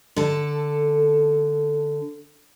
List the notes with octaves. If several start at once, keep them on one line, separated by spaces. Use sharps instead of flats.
D3 A4